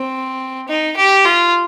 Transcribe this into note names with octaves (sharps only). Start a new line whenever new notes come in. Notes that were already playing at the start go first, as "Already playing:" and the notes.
Already playing: C4
D#4
G4
F4